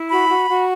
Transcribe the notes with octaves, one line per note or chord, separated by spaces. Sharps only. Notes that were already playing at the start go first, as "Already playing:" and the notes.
Already playing: E4
F#4 B5
F#4
F#4